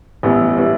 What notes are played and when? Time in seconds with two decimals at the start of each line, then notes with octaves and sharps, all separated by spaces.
0.23 A1 A2 G3 B3 E4
0.57 A2 G3 B3 E4